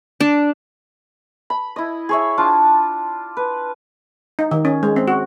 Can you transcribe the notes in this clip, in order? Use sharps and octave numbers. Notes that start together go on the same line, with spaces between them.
D4
B5
E4 D#5
G#4 C#5 E5
D4 F4 A5
B4
D#4
D#3
C#4
G#3
C4
F#4